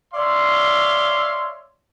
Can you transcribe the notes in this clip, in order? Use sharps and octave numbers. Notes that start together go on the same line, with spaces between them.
C#5 D5 E5 F5 C6